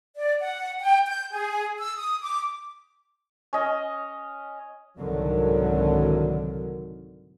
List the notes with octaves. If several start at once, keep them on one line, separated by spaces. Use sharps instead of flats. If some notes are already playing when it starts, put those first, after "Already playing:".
D5
F#5
G5
G6
G#4
E6
D#6
D6
C#4 D#5
C2 G#2 D3 D#3 F#3